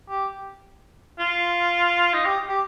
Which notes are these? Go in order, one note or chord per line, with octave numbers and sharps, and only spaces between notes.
G4
F4
D#4
G4
G4